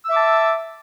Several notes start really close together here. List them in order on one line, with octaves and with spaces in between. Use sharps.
E6 E5 D6 A5